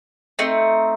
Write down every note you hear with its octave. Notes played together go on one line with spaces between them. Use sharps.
A3 C4 D#4